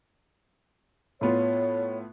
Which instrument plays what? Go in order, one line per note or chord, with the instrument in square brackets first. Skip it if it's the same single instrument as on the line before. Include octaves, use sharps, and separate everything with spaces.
[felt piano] A2 B3 F4 [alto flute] C#5